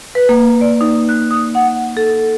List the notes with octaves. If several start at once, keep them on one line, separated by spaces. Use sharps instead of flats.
B4
A#3
D5
D#4
F#6
D#6
F#5
A4